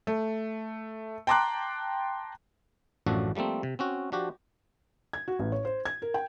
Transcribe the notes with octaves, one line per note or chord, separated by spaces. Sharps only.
A3
G5 A5 A#5 C6 D6 F#6
A1 F#2 A2 F3 D4 F#4
F3 G3 A3 A#3 C4
C3
C4 C#4 F#4
F3 D4 F#4 G4
G#6
F#4
A1
C#5
C5
G#6
A#4
G5